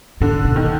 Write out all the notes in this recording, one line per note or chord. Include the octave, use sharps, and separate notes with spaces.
G#2 D3
B2
D#3